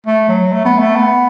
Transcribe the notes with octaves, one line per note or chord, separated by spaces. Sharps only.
A3
F#3
A3
B3
A3
B3